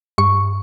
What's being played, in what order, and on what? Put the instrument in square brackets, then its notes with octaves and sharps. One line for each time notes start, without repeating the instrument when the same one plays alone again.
[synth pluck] G2 C#6